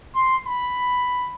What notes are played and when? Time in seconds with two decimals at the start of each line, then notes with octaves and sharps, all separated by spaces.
0.15 C6
0.46 B5